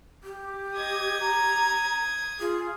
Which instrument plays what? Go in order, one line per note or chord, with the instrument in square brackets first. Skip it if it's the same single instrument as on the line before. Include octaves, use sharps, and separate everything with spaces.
[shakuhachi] G4
[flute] D#5 [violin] D#6 G#6
[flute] A#5
[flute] F4 [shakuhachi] G#4